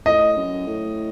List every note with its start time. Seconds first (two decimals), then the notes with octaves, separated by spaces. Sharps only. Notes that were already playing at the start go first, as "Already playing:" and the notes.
0.06 A2 D#5
0.37 F#2
0.67 A2